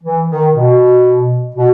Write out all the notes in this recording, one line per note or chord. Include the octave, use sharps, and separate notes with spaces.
E3
D#3
B2
B2